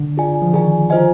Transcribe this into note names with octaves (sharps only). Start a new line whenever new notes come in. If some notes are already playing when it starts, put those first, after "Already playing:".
Already playing: D3
F4 G#4 D5 G#5
F3
D#3 F4 G#4 D5 G#5
F4 C5 D#5 G#5